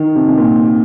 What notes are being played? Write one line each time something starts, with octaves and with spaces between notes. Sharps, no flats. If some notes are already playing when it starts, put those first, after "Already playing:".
Already playing: D#3
C3
C3
A#2